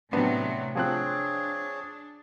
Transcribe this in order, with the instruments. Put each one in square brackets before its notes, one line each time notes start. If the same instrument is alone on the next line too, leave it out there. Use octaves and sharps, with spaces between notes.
[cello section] A2 C3 F#3 [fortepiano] B3 D4
[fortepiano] F3 C4 F#6 [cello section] D4 [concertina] G#4 C#5